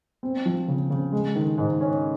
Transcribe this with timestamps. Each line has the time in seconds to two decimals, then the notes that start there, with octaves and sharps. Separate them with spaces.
0.23 C4
0.46 F3
0.68 C#3
0.90 C#3
1.12 G#3
1.36 D#3
1.58 G#2
1.81 C#4